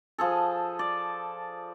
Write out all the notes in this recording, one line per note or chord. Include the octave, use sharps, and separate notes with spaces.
F3 G#4 A4
D5